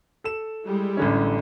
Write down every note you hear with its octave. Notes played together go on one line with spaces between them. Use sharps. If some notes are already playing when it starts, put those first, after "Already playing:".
A4 E7
G3 G#3 E4
A1 D3 C#4